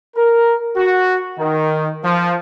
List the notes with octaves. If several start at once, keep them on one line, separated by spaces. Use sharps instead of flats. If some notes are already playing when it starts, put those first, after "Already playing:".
A#4
F#4
D#3
F3